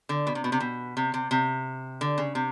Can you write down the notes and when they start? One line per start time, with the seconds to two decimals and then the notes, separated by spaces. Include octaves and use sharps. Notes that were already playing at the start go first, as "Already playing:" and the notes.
0.09 D3
0.27 B2
0.35 C3
0.44 B2
0.52 C3
0.60 B2
0.97 C3
1.14 C3
1.31 C3
2.01 D3
2.18 C#3
2.35 C3